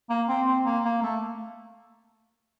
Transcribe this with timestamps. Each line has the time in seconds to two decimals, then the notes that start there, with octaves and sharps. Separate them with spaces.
0.10 A#3
0.28 C4
0.47 C4
0.66 A#3
0.85 A#3
1.03 A3